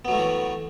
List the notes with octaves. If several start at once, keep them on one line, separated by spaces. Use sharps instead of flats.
A2 E3 F#3 A3 B3